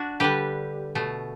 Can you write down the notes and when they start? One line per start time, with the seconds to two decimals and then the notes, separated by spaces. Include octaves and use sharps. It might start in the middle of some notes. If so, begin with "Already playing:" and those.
Already playing: D4 F#4
0.20 D3 G3 G4 B4
0.95 B2 A3